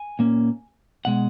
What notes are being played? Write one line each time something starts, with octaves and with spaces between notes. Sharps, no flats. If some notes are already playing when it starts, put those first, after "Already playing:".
Already playing: G#5
A#2 A#3 C#4
B2 G#3 F#5